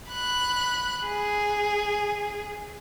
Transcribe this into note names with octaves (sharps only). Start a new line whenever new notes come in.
B5 F#6
G#4